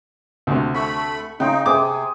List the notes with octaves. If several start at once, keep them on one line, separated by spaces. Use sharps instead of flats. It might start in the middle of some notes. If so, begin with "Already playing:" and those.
D2 C3
A3 B5 C#6
C#3 D#4 G5 C6
C3 G#4 D6